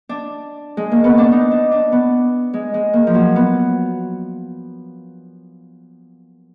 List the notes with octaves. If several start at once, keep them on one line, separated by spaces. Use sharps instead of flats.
D4
G#3
A#3
B3
D4
D#4
D4
D4
B3
G#3
G#3
A#3
F3
F#3
B3